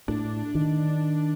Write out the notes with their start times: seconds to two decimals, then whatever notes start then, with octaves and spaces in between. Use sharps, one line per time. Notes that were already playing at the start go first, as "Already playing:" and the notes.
0.08 A2 D4
0.55 D#3